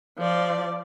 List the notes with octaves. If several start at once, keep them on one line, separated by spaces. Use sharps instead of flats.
F3 D5